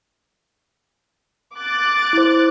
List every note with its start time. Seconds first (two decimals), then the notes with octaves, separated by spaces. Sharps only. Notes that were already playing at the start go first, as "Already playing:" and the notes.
1.56 D6 F#6 A6
2.13 E4 C5